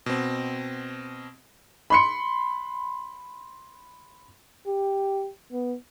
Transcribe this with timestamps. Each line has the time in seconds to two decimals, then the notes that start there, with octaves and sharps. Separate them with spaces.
0.06 B2 C4
1.90 B5 C6 C#7
4.67 G4
5.52 B3